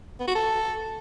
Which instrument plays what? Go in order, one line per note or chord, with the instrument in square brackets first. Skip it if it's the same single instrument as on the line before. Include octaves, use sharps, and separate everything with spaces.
[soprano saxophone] B3
F#4
A4